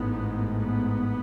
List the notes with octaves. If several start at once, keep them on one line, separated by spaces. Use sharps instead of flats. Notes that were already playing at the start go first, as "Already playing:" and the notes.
Already playing: A1 G#2 B3
B3